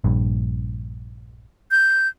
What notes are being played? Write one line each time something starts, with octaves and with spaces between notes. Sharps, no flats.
A#1 G2
G6